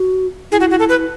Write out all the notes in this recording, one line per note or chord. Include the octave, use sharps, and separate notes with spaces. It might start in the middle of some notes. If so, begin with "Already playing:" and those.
Already playing: F#4
E4 G#4
F#4
F#4
A4
B4